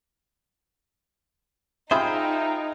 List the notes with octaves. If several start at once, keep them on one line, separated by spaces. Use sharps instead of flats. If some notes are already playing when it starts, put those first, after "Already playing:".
D#4 F4 G#4 C5 E5 G5 B5 D#6